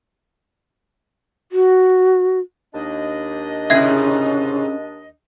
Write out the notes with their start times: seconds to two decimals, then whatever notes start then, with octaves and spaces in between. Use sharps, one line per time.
1.52 F#4
2.75 D#2 D4 D#5
3.70 G#2 C3 C#4 E4 E5 G#6 C7